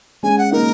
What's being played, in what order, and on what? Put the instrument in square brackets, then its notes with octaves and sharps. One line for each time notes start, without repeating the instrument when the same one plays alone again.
[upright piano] G#3 C#4 [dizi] G#5
[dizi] F#5
[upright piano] A#3 D#4 [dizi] A#4